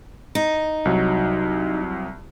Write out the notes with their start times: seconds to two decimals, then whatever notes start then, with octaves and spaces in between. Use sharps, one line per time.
0.35 D#4
0.85 C2 F#3